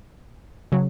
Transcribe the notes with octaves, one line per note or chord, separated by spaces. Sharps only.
C#3 F#3